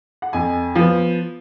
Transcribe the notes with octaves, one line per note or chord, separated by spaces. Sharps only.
F#5
F2 G#5
F3 B3